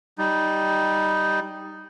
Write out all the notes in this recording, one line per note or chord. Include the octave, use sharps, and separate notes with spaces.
G3 D#4